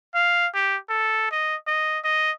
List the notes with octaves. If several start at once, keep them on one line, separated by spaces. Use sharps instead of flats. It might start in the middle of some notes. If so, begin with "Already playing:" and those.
F5
G4
A4
D#5
D#5
D#5